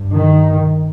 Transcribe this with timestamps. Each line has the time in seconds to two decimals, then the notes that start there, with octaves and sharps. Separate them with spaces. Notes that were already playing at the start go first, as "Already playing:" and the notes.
Already playing: G2
0.13 D#3